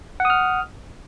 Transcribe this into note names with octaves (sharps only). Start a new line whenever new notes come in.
F#5 D#6 F6